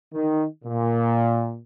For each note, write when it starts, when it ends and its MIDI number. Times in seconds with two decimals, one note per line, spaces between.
0.14 0.44 51
0.64 1.58 46